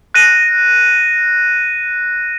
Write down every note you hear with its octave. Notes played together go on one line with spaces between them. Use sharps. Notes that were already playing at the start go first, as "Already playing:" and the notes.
F#6 A#6 D#7